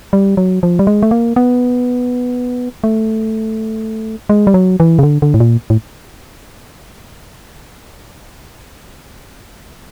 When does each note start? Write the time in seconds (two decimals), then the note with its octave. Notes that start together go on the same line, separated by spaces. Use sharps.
0.13 G3
0.37 F#3
0.63 F3
0.79 G3
0.87 G#3
1.03 A3
1.11 A#3
1.36 B3
2.84 A3
4.29 G#3
4.47 G3
4.54 F#3
4.80 E3
4.99 C#3
5.03 D3
5.22 D3
5.34 A2
5.40 A#2
5.70 A2